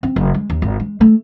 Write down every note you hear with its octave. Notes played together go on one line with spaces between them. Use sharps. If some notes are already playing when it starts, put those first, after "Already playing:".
C4
F#1
G#3
D#2
G#1
G#3
A3